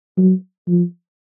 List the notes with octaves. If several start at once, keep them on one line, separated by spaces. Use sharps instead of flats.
F#3
F3